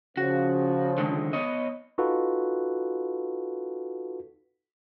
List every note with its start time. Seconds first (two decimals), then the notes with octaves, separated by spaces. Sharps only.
0.17 C#3 F3 F#4
0.98 D3 D#3 G#3
1.33 B3 C#5 D#5
1.98 D#4 F4 F#4 A4 B4